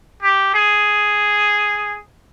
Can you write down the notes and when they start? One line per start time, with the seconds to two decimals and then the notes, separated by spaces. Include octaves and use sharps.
0.23 G4
0.55 G#4